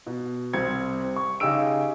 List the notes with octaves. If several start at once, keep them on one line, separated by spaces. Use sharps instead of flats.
B2
C2 C4 G#6 C#7
C#6
C#3 D#4 G4 G#4 E6 D7